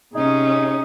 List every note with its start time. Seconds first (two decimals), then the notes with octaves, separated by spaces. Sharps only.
0.14 C3 C#4 D#4 G#4